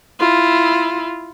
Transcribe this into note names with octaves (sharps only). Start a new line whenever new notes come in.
E4 F4